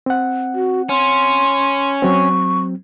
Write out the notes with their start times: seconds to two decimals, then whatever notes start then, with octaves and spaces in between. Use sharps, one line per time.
0.06 C4 F#5
0.55 F#4
0.89 C#4 C6
2.02 F#3 C4 C#6